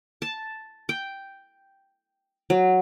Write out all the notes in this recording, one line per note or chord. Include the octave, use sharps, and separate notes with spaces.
A5
G5
F#3